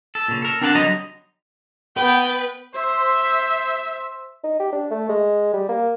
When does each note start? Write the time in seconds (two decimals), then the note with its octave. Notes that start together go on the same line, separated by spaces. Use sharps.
0.15 A4
0.28 A#2 C#3
0.42 A4 A#4
0.61 C4 D4 A#4 F#5 G5 A5
0.75 D3 F#3 G3 D#5 A#5
1.97 B3 B4 G5
2.76 C5 E5
4.43 D#4
4.59 G4
4.72 D4
4.91 A3
5.09 G#3
5.53 G3
5.69 A#3